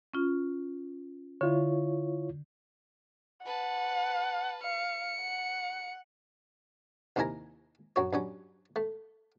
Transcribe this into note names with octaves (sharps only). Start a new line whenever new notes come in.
C#4 F4
D3 E4 F4 C#5
B4 F#5 A5
F5 C#7
F#5
D#2 C3 D#3 E4 G#5 A#5
F#2 F#4 C#5
G2 F#3 C#4
A3